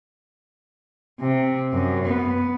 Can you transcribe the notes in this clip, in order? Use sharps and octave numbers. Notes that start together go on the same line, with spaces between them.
C3
F#2
B3